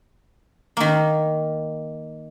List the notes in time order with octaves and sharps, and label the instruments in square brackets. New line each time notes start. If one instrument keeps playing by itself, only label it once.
[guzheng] D#3 A#3